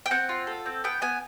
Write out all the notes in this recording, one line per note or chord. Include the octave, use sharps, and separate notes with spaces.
G5
C4 F#5
F4
A4
C4
B3 G5
B3 G#5